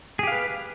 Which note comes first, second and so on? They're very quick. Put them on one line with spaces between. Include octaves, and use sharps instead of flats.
G#4 G4 F5 B4